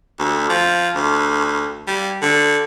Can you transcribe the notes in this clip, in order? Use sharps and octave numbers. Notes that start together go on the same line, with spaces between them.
D2
F3
D2
G3
D3